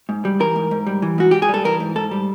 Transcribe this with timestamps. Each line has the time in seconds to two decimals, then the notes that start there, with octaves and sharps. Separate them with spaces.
0.09 G#2
0.25 G3
0.40 E3 A#4
0.56 G#2
0.71 G#2
0.87 G3
1.02 E3
1.18 G#2 F#4
1.31 G#2 G4
1.42 G#4
1.49 G3
1.54 A4
1.64 E3 A#4
1.80 G#2
1.96 G#2 A4
2.11 G3